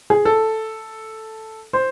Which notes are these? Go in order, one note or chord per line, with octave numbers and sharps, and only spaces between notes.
G#4
A4
C5